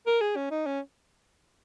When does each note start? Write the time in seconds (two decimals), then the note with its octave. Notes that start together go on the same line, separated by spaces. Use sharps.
0.06 A#4
0.21 G#4
0.36 C#4
0.51 D#4
0.66 C#4